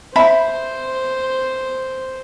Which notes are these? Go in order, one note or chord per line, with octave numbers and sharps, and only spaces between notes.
C5 E5 B5